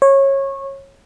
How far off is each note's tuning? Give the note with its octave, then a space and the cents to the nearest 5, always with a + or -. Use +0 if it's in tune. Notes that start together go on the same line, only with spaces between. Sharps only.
C#5 -20